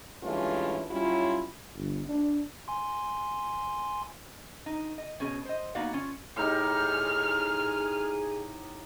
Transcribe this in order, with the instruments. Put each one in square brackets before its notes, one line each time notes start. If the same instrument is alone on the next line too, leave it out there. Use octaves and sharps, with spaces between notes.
[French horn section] G2 E3 G#3 A3 C#4 F4
F#3 G3 C#4 E4 F4
[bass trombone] G1
D4
[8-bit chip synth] G#5 C6
[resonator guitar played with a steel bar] D#4
D#5
B2 C#4 G#4
C5 D#5
A#3 B3 D#4 F#4 D5 F5
C#4 F4
[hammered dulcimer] A2 D#4 G4 [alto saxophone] G#4 [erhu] F6